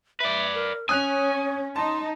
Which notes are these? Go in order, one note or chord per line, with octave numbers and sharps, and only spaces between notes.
B4 D5 E5
A#4
C#4 C#5 G#5 D#6 F#6 F7
D#4 A5 C6